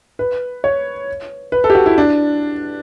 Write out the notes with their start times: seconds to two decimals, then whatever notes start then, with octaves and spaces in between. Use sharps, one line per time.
0.19 B4
0.64 C#5
1.52 B4
1.64 A4
1.70 G4
1.75 F#4
1.86 E4
1.98 D4